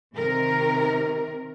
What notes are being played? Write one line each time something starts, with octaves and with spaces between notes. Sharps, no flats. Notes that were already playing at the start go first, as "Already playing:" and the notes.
C3 D#3 A#4